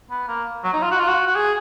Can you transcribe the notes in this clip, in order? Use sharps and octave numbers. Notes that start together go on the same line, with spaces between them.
B3
A#3
F#3
D#4
F4
F#4
F4
F#4
F#4
G#4